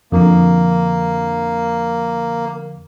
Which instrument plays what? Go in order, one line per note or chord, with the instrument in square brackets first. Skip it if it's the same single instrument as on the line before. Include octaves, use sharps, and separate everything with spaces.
[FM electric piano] F2 D3 [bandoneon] A#3